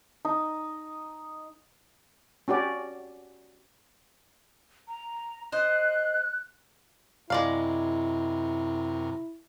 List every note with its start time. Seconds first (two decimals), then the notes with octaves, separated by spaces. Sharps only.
0.25 D#4
2.48 C#4 F#4 G4 D5
4.88 A#5
5.52 C5 D#5 F#6
7.30 F#2 C3 G#3 E4 A#4 D5 F5